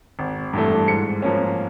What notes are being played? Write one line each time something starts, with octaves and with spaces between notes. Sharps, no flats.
G#1
G2 E3 A3
G#2 C#7
F3 A#3 C#4